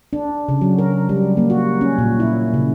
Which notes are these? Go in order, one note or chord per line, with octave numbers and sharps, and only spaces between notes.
D4
C#3
F#3
A#4
G3
A#3
F#4
C#4
A#2
E4
C#3